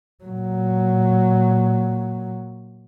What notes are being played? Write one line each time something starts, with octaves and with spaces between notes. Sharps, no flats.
A#2 F#3